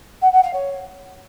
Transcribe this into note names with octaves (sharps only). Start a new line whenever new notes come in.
F#5
F#5
F5
C#5